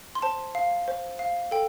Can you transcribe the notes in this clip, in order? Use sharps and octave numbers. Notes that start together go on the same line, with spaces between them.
C6
C5 A5
F5
C5
F5
A4 G5